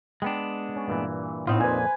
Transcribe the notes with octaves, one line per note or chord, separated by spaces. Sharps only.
G#3 B3 D4 G5
C#4
G2 A#2 E3
A2 B3 C4 D#4 F4
F2 A#2 B4 C5 G#5